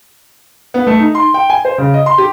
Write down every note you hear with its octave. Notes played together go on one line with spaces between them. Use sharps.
B3
A3
D#4
C6
G5
G#5
C5
C#3
D#5
C6
G4